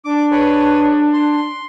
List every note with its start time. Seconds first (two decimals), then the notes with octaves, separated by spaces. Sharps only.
0.05 D4 D6
0.31 G#4 B4 C#5
1.13 C6